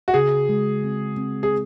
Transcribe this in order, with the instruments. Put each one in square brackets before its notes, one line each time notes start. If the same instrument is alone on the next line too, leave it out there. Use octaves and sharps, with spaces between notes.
[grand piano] F#4
[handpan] C#3 [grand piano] G#4
[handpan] G#3
C4
C4
[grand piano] G#4